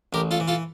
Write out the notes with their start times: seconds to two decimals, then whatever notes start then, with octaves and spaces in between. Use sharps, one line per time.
0.13 A1 G4 A#4
0.31 F4 A4
0.40 E3
0.48 F4 A4